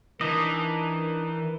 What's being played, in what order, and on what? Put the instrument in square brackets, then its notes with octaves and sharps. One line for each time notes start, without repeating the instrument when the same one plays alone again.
[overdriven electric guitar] E3 [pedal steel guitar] D4 D#4 D#5 [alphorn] A#4